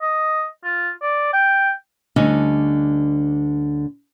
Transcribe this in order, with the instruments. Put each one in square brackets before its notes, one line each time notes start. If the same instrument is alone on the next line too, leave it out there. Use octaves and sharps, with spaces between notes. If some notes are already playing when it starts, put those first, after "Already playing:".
[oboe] D#5
F4
D5
G5
[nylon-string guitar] D2 D3 G3 C#4 D#5